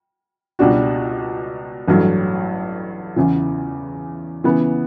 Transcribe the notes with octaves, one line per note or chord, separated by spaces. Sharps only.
C#2 B2 G3 D4 F#4
A1 G2 F#3 A3
E2 C#3 E3
C#3 E3 B3